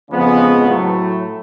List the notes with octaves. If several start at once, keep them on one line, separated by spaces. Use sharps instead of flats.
F2 C#3 F3 G#3 B3
A2 F#3 A3